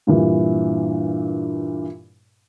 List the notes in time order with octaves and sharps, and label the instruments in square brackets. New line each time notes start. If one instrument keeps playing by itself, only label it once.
[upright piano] G2 A#2 E3